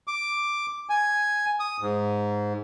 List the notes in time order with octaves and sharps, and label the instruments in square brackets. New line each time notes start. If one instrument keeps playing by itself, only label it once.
[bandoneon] D6
G#5
D#6
G#2